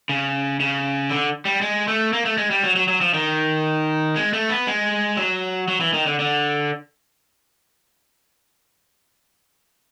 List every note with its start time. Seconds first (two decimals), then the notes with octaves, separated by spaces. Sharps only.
0.09 C#3
0.60 C#3
1.10 D3
1.45 G3
1.61 G#3
1.88 A3
2.13 A#3
2.25 A3
2.38 G#3
2.50 G3
2.64 F#3
2.76 F#3
2.88 F#3
3.01 F3
3.14 D#3
4.16 G#3
4.33 A3
4.49 B3
4.67 G#3
5.17 F#3
5.68 F#3
5.81 E3
5.93 D#3
6.06 D3
6.20 D3